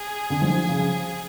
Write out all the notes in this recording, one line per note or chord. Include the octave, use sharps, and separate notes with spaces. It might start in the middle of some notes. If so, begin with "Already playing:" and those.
Already playing: G#4
D3
F3
C#3